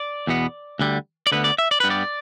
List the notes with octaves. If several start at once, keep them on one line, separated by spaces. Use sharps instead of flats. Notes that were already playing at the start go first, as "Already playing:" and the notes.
Already playing: D5
E2 B2 B3
D2 D3 G3
D5
D2 D3 B3 B4
D5
E5
D5
G2 G3 B3 B4
D5